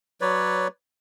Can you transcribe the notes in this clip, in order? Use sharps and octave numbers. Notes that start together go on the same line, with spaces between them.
F#3 B4 C#5 D5